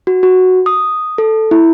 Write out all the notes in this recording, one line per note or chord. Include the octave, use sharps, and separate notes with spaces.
F#4
F#4
D#6
A4
E4